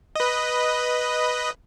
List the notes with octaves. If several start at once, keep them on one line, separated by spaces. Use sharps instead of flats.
B4 D#5